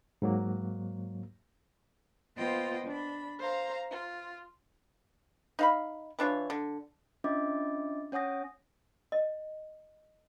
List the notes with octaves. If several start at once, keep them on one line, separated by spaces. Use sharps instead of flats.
G#2 F#3 A#3
A#3 B3 F4 C5 D#5 G5
D4 B5
C5 F5 A#5
F4
D#4 F5 B5
E3 D4 F4 C#5
D3
C#4 D4 F4 D#5 E5 D6
C#4 C#5 F#5 G#5 D#6 A#6
D#5